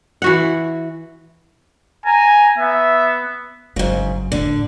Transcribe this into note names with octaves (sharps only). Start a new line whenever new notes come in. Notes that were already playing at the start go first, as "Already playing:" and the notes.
E3 F#4 F#5
G#5 A#5
B3 E5
G1 G#2 C#3 F#3
F#2 A2 D3